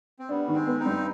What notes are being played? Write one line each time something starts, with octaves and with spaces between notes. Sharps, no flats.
C4
G3 B3 D4
D#3
G#3 C4
B3
C4 D#4
G2